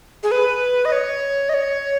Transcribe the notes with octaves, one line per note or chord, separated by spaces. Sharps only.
G#4
B4
D#5
C#5
D#5
C#5